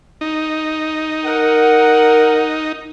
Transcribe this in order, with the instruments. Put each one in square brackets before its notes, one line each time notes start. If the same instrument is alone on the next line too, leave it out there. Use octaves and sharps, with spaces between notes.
[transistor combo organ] D#4
[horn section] A#4 F#5